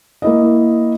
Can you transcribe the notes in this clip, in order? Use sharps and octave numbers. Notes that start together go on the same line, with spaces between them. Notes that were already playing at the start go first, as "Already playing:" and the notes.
A#3 E4 D#5